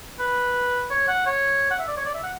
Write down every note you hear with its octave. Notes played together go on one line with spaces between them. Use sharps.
B4
C#5
F#5
C#5
F#5
E5
D5
C#5
D5
E5
F#5